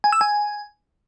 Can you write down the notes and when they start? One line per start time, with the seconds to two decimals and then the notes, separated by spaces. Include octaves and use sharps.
0.04 G#5
0.12 E6
0.21 G#5